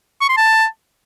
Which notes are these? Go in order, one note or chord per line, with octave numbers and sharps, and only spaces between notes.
C#6
C6
A5